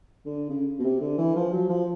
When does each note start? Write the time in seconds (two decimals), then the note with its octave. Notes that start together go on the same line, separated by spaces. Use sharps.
0.26 D3
0.49 C#3
0.79 B2
0.84 C3
1.00 D3
1.18 E3
1.35 F3
1.52 F#3
1.69 F3